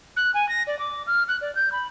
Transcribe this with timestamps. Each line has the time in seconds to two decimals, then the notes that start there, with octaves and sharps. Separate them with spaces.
0.16 F#6
0.34 G#5
0.49 A#6
0.67 D5
0.79 D6
1.07 F6
1.28 F#6
1.41 D5
1.55 G6
1.72 B5